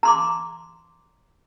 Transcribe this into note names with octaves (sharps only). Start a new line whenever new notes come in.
A#5 C6 D6